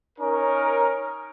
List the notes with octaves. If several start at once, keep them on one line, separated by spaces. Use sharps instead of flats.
C#4 D#4 A#4